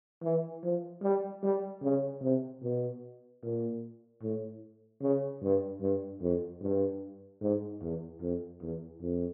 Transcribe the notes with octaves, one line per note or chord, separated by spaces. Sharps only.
E3
F3
G3
G3
C#3
C3
B2
A#2
A2
C#3
G2
G2
F2
G2
G#2
E2
F2
E2
F2